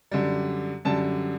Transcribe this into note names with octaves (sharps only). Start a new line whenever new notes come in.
F#2 D3 G3
F#2 D3 G3 A5